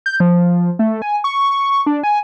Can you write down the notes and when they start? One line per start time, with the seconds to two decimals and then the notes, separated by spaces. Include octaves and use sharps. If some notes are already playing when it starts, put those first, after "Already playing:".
0.06 G6
0.20 F3
0.79 A3
1.02 G#5
1.24 C#6
1.86 D4
2.03 G#5